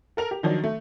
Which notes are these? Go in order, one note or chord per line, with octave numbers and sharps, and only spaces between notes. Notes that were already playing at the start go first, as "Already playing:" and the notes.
A4 A#4 F7
G4
D#3 F3 F#3 D4
A3